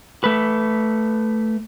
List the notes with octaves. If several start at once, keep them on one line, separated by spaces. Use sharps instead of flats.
A3 B4